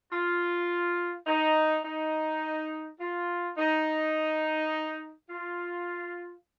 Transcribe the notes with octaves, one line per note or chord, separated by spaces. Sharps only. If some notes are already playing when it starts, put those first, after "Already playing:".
F4
D#4
D#4
F4
D#4
F4